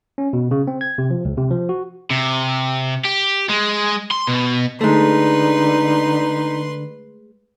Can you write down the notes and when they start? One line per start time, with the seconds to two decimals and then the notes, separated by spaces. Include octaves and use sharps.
0.18 C#4
0.33 B2
0.51 C#3
0.67 C4
0.81 G#6
0.98 C3
1.11 F3
1.25 C#2
1.37 C3
1.51 F3
1.69 F#4
2.10 C3
3.04 G4
3.49 G#3
4.11 C6
4.27 B2
4.81 D3 G#3 A3 D#4 B4 C6